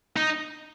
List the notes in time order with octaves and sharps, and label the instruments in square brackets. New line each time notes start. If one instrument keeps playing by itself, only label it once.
[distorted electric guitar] D#4